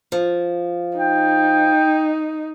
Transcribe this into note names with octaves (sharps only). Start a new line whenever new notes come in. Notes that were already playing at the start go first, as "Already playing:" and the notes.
F3
D#4 G5